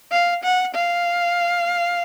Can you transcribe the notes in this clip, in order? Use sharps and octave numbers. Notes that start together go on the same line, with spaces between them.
F5
F#5
F5